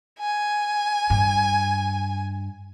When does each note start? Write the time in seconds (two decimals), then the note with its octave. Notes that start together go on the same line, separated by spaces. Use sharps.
0.19 G#5
1.10 G2